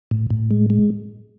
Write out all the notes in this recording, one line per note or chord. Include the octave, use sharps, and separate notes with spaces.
A2
A2
G#3
G#3